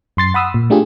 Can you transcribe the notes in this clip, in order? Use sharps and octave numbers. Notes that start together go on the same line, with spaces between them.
F#2 C6 A6 C7
F#5 B5 D#6 E6
A#2
A3 D4 F4 G4 G#4